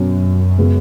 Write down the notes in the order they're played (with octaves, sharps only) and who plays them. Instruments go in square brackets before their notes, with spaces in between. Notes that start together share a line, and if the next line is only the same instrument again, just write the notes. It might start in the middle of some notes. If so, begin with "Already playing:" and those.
Already playing: [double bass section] F#2 [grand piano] B2 F#3 C#4
[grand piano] C#3 G#3 B3